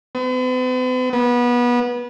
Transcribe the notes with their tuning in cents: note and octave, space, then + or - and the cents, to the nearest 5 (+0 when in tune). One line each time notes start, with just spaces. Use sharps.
B3 +45
B3 -25